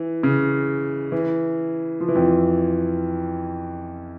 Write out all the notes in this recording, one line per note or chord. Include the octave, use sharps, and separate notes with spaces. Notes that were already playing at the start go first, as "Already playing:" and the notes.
Already playing: E3
C#3
E3
F3
E3
F2 F3